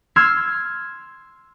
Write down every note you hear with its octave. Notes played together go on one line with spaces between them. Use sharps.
C6 E6 F6 G#6 C7